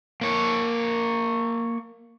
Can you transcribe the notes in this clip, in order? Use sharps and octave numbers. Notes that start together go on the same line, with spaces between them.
A#3 C#5